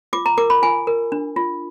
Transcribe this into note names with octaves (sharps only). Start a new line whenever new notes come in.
F4 D6
A#5
A#4 D6
B5
F4 G#5
A#4
D4
F4